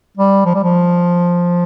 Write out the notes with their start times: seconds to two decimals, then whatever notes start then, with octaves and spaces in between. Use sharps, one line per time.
0.18 G3
0.45 F3
0.54 G3
0.63 F3